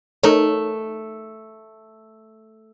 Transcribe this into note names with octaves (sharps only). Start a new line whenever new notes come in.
A3 D#4 A#4 C#5